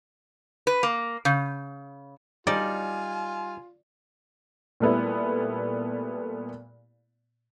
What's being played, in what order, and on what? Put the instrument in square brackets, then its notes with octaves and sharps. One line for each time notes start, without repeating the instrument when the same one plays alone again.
[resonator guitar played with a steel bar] B4
A#3
C#3
[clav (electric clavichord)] G3 D#4 [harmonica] F4 [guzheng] D5 [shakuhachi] G#5
[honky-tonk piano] A#2 G3 A3 B3 E4